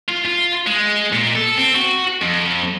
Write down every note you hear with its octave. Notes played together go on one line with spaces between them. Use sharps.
F4
F4
G#3
A#2
A4
C4
F#4
F2